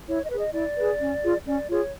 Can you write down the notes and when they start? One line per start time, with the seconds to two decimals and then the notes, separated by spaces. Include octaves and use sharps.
0.07 E4 C#5
0.23 D#5
0.30 G#4 B4
0.38 D#5
0.53 E4 D5
0.77 G#4 B4
1.00 C#4
1.23 F4 G#4
1.47 C#4 D5
1.70 F4 G#4 C#5